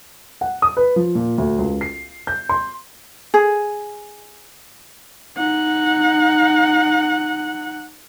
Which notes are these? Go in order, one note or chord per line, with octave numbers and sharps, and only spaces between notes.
F#5
D#6
B4
F3
A#2
D2
C#2
C7
G6
C6
G#4
D#4 F#5